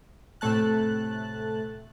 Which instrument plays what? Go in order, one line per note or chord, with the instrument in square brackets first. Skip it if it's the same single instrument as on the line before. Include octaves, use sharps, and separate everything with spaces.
[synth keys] A2 C3 A3 A5 F#6